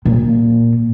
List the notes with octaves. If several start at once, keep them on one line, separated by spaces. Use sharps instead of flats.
A#2